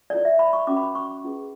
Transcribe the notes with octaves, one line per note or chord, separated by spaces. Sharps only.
E4 A4 C#5 D5
E5
B5
C#6
C#4 F#4 B4 D6
B5
C#6
C#4 E4 G#4 B4